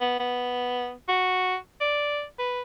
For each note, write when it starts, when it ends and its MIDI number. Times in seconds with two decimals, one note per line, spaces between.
0.01 0.14 59
0.19 0.92 59
1.08 1.56 66
1.80 2.24 74
2.38 2.61 71